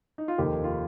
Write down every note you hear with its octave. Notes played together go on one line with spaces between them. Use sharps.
D#4
F4
F1 D#2 D#3 G4
F4